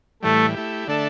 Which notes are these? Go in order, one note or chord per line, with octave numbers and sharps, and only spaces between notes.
A2 E3 G3 A3
A3 E4 G4
D3 A3 D4 A4 E5